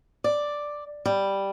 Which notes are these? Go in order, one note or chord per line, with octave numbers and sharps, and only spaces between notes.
D5
G3